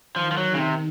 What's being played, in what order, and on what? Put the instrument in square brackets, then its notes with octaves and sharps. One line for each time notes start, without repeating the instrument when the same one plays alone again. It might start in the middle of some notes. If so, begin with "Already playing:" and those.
[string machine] D#3 [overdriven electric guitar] F3
[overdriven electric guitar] F3
F#3
C#3
C3